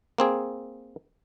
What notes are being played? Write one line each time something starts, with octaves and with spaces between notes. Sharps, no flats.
A#3 C4 G#4